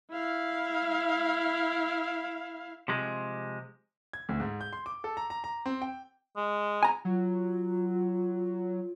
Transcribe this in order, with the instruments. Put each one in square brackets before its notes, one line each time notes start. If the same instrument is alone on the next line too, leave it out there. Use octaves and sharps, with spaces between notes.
[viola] E4 F5
[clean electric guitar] C3 F3 G#3
[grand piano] G#6
D2
G#2
G6
C6
D6
A4
A#5
A#5
A#5
C4
G5
[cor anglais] G#3
[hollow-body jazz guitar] G#5 A#5
[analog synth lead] F#3 [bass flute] F4